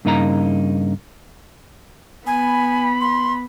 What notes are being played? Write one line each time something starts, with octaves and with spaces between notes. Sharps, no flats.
G2 C#3 A#3 D#4 F4 A#5
B3 G#5 B5
C6